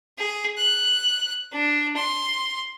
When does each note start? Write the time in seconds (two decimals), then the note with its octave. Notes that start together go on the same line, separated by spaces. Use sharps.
0.18 G#4
0.57 F#6
1.52 D4
1.96 C6